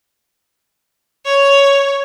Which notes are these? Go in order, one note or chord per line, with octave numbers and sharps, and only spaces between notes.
C#5